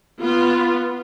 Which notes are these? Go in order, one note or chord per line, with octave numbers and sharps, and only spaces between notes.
B3 F4